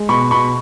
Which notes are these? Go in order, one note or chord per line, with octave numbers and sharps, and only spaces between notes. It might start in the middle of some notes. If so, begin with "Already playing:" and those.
Already playing: G#3
B2 B5 C#6
B2 B5 C#6